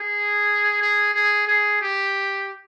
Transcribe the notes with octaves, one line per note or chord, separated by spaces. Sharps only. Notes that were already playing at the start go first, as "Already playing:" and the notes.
Already playing: G#4
G#4
G#4
G#4
G4